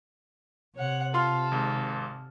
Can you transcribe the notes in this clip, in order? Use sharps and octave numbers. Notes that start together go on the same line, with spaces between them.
C3 C#5 F#5
F4 A4 C6 F6
G#1 G#2